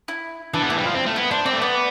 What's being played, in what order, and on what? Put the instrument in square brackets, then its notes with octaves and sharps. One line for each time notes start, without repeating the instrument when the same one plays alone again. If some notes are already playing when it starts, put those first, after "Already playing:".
[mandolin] E4
[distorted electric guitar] E3 [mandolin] D4
[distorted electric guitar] B3
[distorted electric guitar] A3 [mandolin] E4
[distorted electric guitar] G3
F3
C4
A3
[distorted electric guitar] B3 [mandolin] E4
[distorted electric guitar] D4 [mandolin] C5
[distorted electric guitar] C4 [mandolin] D5
[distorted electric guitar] A3
[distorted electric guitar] B3 [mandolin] D5